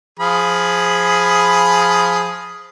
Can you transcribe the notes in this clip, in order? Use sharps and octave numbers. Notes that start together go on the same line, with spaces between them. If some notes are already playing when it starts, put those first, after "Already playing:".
F3 G#4 B5